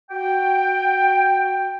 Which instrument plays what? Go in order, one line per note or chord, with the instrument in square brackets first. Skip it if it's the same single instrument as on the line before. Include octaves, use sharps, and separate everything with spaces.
[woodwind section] F#4 G5